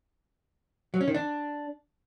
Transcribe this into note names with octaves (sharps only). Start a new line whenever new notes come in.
F#3
C#4
D#3
D4